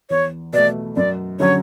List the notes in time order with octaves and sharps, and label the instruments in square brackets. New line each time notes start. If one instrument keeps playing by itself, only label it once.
[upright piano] E2 [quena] C#5
[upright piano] B2 A3 [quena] D5
[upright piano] F#2 [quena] D5
[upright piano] D3 F#3 C#4 F#4 [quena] C#5